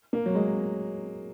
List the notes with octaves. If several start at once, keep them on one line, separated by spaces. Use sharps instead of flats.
A#3
F#3
G#3